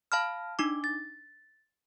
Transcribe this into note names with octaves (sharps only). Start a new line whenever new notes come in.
F5 A5 B5 F6
D4 D#4 D6
A6